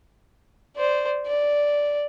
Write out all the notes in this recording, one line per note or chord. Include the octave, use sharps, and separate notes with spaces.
C5 D5
D5